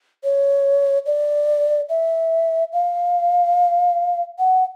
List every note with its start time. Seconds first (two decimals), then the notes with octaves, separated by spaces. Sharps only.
0.24 C#5
1.06 D5
1.89 E5
2.73 F5
4.39 F#5